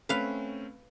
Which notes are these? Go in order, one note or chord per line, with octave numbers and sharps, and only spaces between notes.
A3 C4 C#4 B4 F5